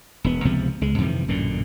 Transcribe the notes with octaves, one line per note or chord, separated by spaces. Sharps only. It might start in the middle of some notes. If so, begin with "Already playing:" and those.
E1 B3
C#2 C3 F3 B3
C#2 G#3
F2 C3 D#3 E3
A1 F#2 A#2 D3